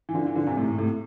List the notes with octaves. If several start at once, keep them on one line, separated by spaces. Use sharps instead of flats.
E3
D3 F3
E3
D3 F3
C3 E3
A2 C3
A2
A2 C3